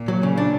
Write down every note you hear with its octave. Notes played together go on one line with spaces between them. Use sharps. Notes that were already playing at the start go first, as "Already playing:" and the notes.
Already playing: A#2
F#3
C#3
D4